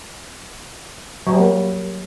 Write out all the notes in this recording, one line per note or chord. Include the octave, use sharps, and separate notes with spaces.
F#3
G3
A#3